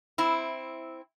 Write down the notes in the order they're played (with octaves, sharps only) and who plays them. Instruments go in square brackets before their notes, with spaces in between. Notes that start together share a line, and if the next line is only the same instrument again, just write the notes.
[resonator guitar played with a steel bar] C4 E4